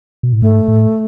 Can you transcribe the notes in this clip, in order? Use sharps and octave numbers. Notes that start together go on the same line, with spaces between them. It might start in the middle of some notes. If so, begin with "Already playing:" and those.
B2
A2
G#2 A3
A2